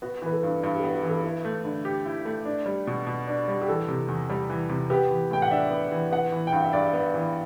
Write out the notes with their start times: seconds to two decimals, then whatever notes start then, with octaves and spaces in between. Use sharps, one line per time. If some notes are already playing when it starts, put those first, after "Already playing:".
0.02 B3 F#4
0.22 E3 B4
0.32 A4
0.43 G2
0.48 D4
0.63 G2 E4
0.74 G4
0.78 A4
0.83 B3
0.94 F#4
1.03 E3
1.09 A4
1.24 E4 B4
1.45 A3
1.65 D3
1.85 G4
2.06 E4
2.25 A3
2.45 D4
2.66 G3
2.87 B2
3.07 B2
3.28 D4
3.48 G3
3.62 G4
3.68 E3 A4
3.88 C3
4.08 E2
4.30 G3
4.50 E3
4.69 C3
4.90 B3 G4
5.10 E3
5.31 A2 G5
5.42 F#5
5.51 D4 E5
5.71 B3
5.92 E3
6.11 B3 F#5
6.32 E3
6.47 G5
6.53 G2 F#5
6.64 E5
6.73 G2 D5
6.93 B3
7.14 E3